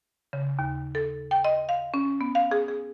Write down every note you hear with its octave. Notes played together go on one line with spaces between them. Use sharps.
C#3
D#2
A4
G5
D#5
F5
C#4
B3
F5
G#4
G#4